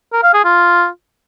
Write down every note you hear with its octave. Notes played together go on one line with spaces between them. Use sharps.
A#4
F5
G#4
F4